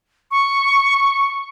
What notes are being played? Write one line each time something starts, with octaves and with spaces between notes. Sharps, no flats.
C#6